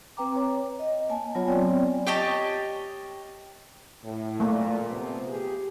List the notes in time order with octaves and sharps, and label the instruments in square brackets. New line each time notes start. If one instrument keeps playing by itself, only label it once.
[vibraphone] C4 B4 G5 A#5 D6
C#5
D#5
A#3 G#5 A5
F#3 B3 F4 C#5
C4 C#5 D5 G5 G#5
[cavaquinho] G4 C#5 D#5 A5
[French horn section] A2
[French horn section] A#2 [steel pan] A3 A#3
[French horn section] C3 F3 B3
G4 G#4